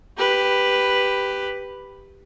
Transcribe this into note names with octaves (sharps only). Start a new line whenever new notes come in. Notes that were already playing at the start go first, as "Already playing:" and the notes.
G4 B4